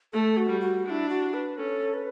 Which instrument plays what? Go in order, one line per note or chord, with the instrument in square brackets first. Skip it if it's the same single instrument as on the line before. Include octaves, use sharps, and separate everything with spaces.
[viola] A3 [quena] A4
[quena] F#4
[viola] G3
[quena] F#4
[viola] D4 [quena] E4 F#4
[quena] F#4
B4
[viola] C#4 [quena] A4
[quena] B4